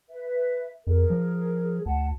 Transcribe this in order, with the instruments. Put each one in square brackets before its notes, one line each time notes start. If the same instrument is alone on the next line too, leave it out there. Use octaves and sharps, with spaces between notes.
[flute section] B4 E5
[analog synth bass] F2 [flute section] G#4 A#4
[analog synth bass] F3
[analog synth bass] D2 [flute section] F#5 A5